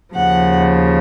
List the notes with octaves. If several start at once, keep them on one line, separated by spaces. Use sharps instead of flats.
D#2 C#3 F3 F#5